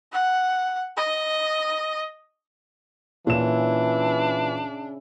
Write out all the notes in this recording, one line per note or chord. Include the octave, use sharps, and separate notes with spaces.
F#5
D#5
A#2 C#3 E3 D4 E4 E7